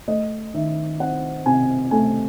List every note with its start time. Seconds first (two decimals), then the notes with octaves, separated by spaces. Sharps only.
0.08 A3 D#5
0.54 D#3 E5
1.00 C4 F#5
1.46 C3 G#5
1.91 A3 G#5